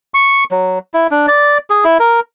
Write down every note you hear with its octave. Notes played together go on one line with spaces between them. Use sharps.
C#6
F#3
E4
D4
D5
G#4
E4
A#4